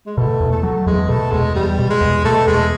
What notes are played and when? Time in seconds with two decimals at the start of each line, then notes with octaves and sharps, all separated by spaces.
0.06 G#3
0.17 B2 A3
0.40 E2
0.52 A3
0.63 F#3
0.86 E2 G#3
1.09 B2 A3
1.32 E2 G#3
1.55 E2 G3
1.78 B2
1.90 G#3
2.01 E2
2.25 B2 A3
2.47 E2 G#3